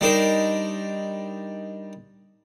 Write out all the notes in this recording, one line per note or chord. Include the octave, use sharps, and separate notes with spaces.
G3 D4 D#4 A#4 C5